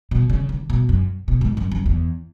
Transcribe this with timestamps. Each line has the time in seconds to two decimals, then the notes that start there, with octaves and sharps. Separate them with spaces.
0.11 B2
0.30 C#3
0.49 D3
0.70 B2
0.89 F#2
1.28 B2
1.41 G#2
1.57 F#2
1.72 F#2
1.86 E2